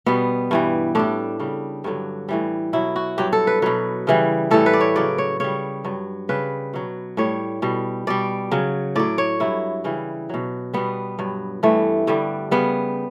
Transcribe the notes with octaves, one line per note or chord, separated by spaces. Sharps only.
B2 G3 B3
G2 E3 G3
A2 G3 D4
C#3 G3
G2 D3 F#3
A2 E3 G3
B2 F#3 E4
F#4
G2 F#3 G4
A4
B4
B2 F#3 B4
C#3 E3 G3
A2 E3 G3 A4
B4
D5
C#5
C#3 F#3 D5
C#5
C#3 G3 C#5
G2 F#3
C#3 G3 B4
B2 F#3
A2 G3 C#5
B2 G3
B2 G3 D5
C#3 F#3
A2 F#3 D5
C#5
G2 F#3 E4
C#3 E3 G3
B2 F#3
B2 G3 B3
G2 F#3
G2 E3 G3 A3
G2 D3 G3
C#3 G3 B3